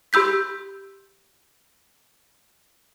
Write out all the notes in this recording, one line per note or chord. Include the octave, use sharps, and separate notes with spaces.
G4 B5 E6 G6 B6